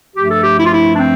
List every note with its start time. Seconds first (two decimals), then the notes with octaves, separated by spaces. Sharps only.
0.15 G2 F3 A3 G4
0.29 A4
0.42 G4
0.57 E4
0.65 F4
0.72 E4
0.95 D4
0.98 C4